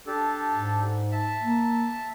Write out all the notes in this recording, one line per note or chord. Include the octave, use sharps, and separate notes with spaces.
D4 G4 A4
G#2
E5 A5
A#3